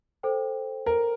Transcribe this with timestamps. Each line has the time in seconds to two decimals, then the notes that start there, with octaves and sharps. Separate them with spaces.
0.23 A4 C5 G5
0.86 A#4